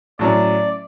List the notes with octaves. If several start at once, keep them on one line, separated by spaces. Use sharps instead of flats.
A2 F#3 C#4 D5